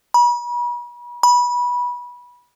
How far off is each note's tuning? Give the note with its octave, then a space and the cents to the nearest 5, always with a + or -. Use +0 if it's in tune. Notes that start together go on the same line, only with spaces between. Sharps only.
B5 -40
B5 -20